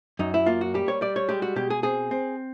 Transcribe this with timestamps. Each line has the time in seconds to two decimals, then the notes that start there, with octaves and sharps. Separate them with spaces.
0.19 F#2 D#4
0.34 E4
0.46 A#3 F4
0.61 F#4
0.74 G3 G4
0.88 C#5
1.01 G3 D5
1.16 C#5
1.29 G#3 G4
1.42 F#4
1.56 B2 G4
1.70 G#4
1.83 C4 G#4
2.11 C4